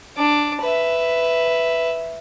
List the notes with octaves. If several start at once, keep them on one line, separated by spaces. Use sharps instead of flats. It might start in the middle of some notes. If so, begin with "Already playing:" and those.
D4 D6
B4 E5